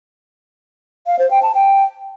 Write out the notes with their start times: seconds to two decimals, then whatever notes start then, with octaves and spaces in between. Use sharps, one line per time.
1.07 F5
1.19 C5
1.31 G5
1.43 A5
1.55 G5